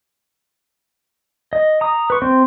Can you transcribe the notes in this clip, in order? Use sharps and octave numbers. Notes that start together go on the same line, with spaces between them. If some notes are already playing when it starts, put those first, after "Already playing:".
D#5
A#5 D#6
B4 C#6
C4 C5